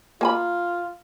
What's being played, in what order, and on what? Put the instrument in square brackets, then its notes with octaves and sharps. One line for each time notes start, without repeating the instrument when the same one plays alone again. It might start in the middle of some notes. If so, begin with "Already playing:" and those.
[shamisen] A#3 G#5 B5 [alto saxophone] F4